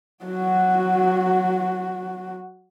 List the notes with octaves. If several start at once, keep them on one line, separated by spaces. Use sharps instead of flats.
F#3 F#4